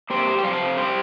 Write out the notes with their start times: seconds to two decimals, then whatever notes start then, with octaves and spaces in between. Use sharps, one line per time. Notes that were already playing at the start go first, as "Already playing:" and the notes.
0.10 A#3 G4 C5
0.27 G3
0.38 G5
0.44 C3 C5 F5
0.61 C3
0.77 G3 G4 C5